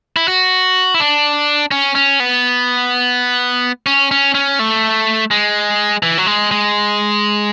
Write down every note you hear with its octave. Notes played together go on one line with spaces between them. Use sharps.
E4
F#4
E4
D4
C#4
C#4
B3
C#4
C#4
C#4
A3
G#3
E3
F#3
G#3
G#3